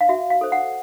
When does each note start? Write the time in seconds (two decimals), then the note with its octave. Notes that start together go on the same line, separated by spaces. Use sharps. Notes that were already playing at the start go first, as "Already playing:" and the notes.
0.01 F5
0.09 F#4 E5
0.30 F5
0.41 A4 C5
0.52 F#5